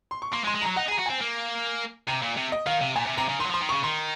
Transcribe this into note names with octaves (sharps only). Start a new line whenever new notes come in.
C6
C#6
A#3 C6
G#3
C6
G#3
F#3 A#5
D#4 F#5
G#4
A#5
F#4
C4 G#5
A#3
C3 A#5
A#2
C3
D#5
D#3 F5
C3
A#2 G#5
C3
C3 A#5
C#3
D#3 C6
F#3
F3
C6
D#3
C#3 C#6
D#3 C6